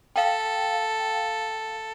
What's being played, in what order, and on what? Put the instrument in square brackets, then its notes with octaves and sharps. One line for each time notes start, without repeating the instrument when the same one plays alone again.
[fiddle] A4 [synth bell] F5 G5